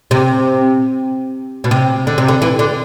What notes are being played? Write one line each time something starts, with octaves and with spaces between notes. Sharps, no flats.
C3
B2
C3
D3
C3
D3
E3
D3